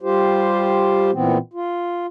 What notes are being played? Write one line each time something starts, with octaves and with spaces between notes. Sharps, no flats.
G3 F4 G4 C5
A#2 E3 B3 C4
F4